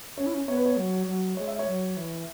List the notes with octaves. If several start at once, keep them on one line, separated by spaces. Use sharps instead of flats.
C#4 C#5
E4
C#4
B3 C#5
B4
C#5
F#3
F#3
G#3 C#5
E5
C#5
F#3
E3